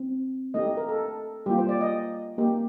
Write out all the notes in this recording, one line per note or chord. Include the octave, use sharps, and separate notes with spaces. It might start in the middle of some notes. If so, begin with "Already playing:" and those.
Already playing: C4
A3 D#4 G4 D#5
A#4
A4
G3 A#3 F4 G4
C5
D5
D#5
A#3 D#4 G4